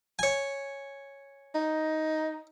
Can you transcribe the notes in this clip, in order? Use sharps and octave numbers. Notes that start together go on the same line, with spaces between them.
C#5 G#5
D#4